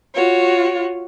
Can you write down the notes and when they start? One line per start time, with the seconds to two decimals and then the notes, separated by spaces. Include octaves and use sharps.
0.16 F4 F#4 C#5